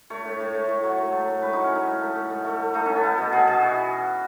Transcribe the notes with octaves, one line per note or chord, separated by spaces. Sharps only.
A3 C#5
A2
A2
A2
A2
F#3
A2
A3
A2
A2 B4
F#3 D#4
C#4
A2 D#4
A3
A3
A3
A3
A3
A3
A3 D#4
A3 C#4
B3
A3
B2
B2 G#4
B2 G#4
E3 F#4